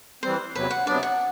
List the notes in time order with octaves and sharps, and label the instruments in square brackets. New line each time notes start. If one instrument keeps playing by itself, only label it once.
[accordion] E3 G3 C4 [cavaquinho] C5
[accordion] E2 C3 F#3 [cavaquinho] B4
[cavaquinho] F#5
[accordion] C3 F#3 B3 D4 [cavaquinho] D5
[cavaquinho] F#5